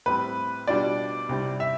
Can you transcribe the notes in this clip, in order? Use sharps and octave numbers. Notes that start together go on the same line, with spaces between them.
A2 G3 C4 B4
B2 G3 D4 F4 D5
C2 C3 G3
E5